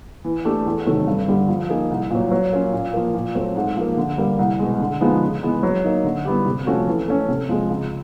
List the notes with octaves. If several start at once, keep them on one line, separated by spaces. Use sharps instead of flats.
E3
A3 D4 G4
E2
C3 D#3 F#3 A3
G2
D3 G3
F3
A#3 D#4 G#4
C2
A#2 F#3
F#3
A#3 C#4 F4
A#2
F3 A#3
A#2
F#3 A3 C4
G#2
F3 A#3
D3
G3 A#3
C2
B2 G#3
D3
F3 G#3 B3 D#4
C#3
E3 G#3 B3
F#3
A#3 D#4
D3
G3 B3 E4 G4
C3
F3 A3 C#4 F#4
E3
A3 C#4
C3
F3 G#3
C#2